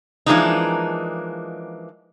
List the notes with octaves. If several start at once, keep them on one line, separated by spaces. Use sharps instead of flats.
E3 F3 G#3 A#3 D4 D#4